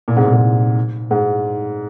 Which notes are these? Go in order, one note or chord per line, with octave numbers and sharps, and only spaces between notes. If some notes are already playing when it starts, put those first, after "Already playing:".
A#2
G#2 C3
A#2
G#2
G#2